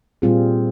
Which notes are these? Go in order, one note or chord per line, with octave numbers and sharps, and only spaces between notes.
A#2 G3 C4 F4 G#4